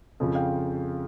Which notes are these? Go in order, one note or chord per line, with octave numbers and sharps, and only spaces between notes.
F2 C#3 F3
F5 G5